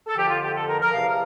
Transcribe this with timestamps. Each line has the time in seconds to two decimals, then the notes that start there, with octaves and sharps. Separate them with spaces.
0.07 A4
0.16 F2 D3 F3 G4
0.29 F4
0.43 G4
0.55 A4
0.68 A#4
0.81 A#4
0.93 E2 C3 F3 F5
1.06 A#4